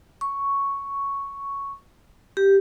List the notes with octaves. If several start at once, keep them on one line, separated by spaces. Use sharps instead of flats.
C#6
G4